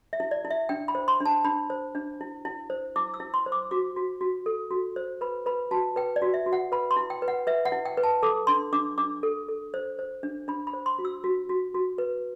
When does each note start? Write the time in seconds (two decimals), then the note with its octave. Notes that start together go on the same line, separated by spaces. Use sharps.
0.13 E5
0.20 E4
0.31 D5
0.45 E4
0.50 E5
0.69 D4 G5
0.88 B5
0.95 C5
1.08 C6
1.20 D4
1.26 A5
1.45 D4 B5
1.70 C5
1.95 D4
2.21 E4
2.45 E4
2.70 C5
2.96 E4 D6
3.14 E6
3.20 E4
3.34 C6
3.46 C5
3.52 D6
3.71 F#4 D6
3.96 F#4
4.21 F#4
4.46 A4
4.71 F#4
4.96 C5
5.21 B4 B5
5.46 B4 B5
5.71 F#4 A5
5.96 B4 G5
6.16 D5
6.22 F#4
6.34 E5
6.46 F#4
6.53 F#5
6.72 B4 B5
6.91 C6
6.97 E4
7.10 G5
7.22 B4
7.28 F#5
7.47 B4 E5
7.65 F#5
7.72 E4
7.85 G5
7.97 B4
8.03 A5
8.23 A4 D6
8.47 D4 C6
8.73 D4 D6
8.98 D4 D6
9.23 A4
9.49 A4
9.74 C5
9.99 C5
10.23 D4
10.48 D4 B5
10.67 B5
10.73 C5
10.86 C6
10.99 F#4
11.05 E6
11.24 F#4
11.49 F#4
11.74 F#4
11.98 B4